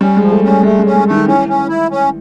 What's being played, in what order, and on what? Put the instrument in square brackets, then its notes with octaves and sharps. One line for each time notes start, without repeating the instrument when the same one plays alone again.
[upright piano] G3 [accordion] C#4
[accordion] F3 [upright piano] G#3
[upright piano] A3
[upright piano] G3 [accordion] C#4
[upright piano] G#3 [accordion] A3
[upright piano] G#3
[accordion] C#4
[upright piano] G#3
[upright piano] D#3 [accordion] A3
[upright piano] E3 [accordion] C#4
[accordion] C#4
E4
C#4